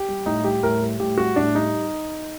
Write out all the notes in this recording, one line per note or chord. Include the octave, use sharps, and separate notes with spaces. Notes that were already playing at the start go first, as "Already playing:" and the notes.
Already playing: G4
G3
A2 D#4
G3 G4
A2 A#4
G3
A2 G4
G3 F#4
A2 D4
G3 D#4